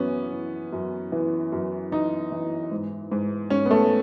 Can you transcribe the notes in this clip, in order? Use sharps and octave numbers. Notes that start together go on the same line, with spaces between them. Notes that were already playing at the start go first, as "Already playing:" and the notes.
Already playing: F#2 E3 B3 C#4
E3
F#2
E3
F#2
E3 D#4
E3
G#2
G#2
G#2 C#4
B3
A3